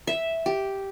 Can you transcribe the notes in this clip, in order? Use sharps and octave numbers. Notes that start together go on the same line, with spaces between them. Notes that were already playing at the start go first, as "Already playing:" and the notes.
E5
G4